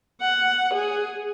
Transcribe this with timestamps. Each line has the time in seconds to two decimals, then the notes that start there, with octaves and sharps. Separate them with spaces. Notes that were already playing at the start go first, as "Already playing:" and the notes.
0.22 F#5
0.74 G#4